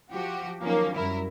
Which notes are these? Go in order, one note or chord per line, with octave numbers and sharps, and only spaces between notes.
F3 F#4 G4
D#3 F3 F#3 A#3 C#4
F#2 G3 E4 A#4